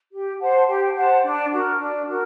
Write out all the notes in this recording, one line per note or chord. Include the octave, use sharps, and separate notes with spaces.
G4
C5 F#5 A5
G4
C5 F#5 A5
D4
F#4 A#4
D4
F#4 A#4